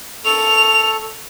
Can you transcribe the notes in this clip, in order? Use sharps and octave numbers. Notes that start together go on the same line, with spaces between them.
A4 C#6 F7